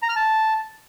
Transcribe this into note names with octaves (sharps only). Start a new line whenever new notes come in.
A#5
F6
A5